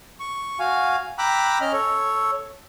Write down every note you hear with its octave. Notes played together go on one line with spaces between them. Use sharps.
C#6
F#4 F5 G#5
G5 A#5 B5 D6 E6 F#6
C#4 D#5 F6
A4 C#5